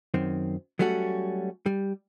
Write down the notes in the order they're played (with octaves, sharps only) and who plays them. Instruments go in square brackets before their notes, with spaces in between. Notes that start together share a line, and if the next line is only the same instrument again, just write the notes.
[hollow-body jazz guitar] F#2 D#3 C4
F#3 G3 A3 C#4 F#4
G3